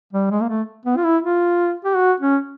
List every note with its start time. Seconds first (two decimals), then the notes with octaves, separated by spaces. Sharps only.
0.13 G3
0.31 G#3
0.42 A#3
0.49 A3
0.86 B3
0.97 F4
1.05 E4
1.23 F4
1.85 G4
1.96 F#4
2.20 C#4